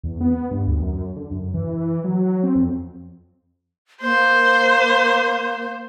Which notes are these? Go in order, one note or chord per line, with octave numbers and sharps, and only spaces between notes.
E2
B3
G2
D2
F#2
D3
F#2
E3
F#3
C4
F2
A#3 C5